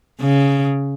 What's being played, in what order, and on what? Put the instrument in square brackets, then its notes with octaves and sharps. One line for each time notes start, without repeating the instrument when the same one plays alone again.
[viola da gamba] C#3